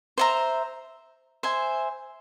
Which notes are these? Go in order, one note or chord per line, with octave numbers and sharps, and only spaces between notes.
C5 E5 A#5
C5 E5 G#5